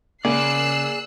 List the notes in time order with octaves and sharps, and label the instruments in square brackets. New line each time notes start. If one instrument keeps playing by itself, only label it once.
[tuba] C#3 [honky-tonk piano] A#3 [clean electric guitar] G#4 D5 [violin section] E6 F#6 C7